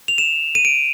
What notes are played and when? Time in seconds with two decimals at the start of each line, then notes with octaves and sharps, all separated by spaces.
0.08 F7
0.18 E7
0.55 D#7
0.65 D7